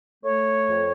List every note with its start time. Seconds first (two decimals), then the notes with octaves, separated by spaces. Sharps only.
0.24 A3 C#5
0.68 F2